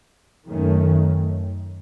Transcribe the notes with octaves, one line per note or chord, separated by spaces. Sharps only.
F#2 D#3 A3 C#4